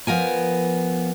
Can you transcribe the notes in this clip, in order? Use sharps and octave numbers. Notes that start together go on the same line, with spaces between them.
F3 B3 A#4 G#5